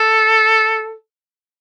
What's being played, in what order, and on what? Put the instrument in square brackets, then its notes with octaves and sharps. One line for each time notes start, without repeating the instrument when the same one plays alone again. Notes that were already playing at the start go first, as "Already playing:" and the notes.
Already playing: [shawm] A4